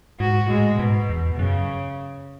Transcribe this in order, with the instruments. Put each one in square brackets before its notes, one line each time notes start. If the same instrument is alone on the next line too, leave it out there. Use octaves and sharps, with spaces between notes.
[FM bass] G#2 [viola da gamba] F#4
[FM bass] A2 [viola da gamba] G#3
[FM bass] G#2 [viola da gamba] B2
[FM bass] E2
[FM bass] F#2 [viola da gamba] C#3